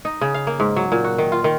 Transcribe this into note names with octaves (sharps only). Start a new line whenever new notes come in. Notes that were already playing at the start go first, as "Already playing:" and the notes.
D#4
C#3
F5
A#3
G#2
F#3
A#2
F#4
D#3
F4
D#3